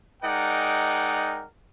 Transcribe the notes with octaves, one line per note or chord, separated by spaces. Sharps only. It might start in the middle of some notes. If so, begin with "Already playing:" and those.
G#3 D#4 A#4 D5 F#5 G5